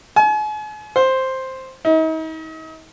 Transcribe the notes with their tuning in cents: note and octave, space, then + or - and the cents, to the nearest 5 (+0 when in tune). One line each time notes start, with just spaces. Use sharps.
G#5 +40
C5 +5
D#4 +40